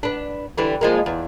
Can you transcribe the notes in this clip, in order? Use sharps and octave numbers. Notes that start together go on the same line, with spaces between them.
B3 D4
D3 E3 G3
F3 G#3 A#3
E2